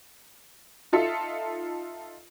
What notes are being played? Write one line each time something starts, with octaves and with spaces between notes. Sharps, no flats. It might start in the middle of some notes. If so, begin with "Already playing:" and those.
D#4 F4 A4 E5